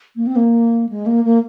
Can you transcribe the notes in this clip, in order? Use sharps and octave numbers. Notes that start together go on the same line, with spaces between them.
A#3
C4
A#3
G#3
A#3
A#3